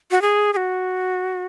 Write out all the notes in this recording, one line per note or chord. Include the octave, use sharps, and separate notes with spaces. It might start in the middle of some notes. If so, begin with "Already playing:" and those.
F#4
G#4
G#4
F#4